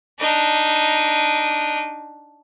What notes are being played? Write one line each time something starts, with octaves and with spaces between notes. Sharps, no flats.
D4 D#4